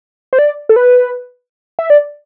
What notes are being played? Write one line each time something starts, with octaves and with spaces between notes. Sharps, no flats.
C5
D5
A4
B4
E5
D5